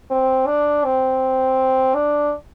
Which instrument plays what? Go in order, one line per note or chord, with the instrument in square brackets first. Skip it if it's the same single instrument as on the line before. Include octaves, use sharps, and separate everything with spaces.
[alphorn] C4
D4
C4
D4